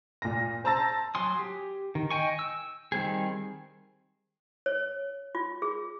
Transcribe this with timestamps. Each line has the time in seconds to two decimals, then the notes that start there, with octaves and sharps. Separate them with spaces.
0.22 A#2 A#6
0.64 C5 A5 A#5 E6 A6 A#6
1.15 F#3 G#5 C6 D#6
1.39 G4
1.95 D#3
2.10 D#5 G5 G#5 C#6
2.39 E6
2.92 D#3 G3 C4 G#4
4.66 C#5
5.35 F4
5.62 G#4